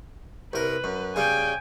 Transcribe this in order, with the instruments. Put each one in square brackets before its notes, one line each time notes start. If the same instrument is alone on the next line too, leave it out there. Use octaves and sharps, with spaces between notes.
[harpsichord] C2 A#4 [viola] B4
[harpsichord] F#2
[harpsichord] C#3 G3 [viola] G5 G#5